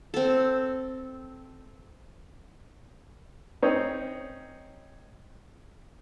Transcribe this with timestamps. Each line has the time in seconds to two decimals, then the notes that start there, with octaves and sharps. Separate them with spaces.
0.14 C4 A4
3.63 C4 C#4 D#4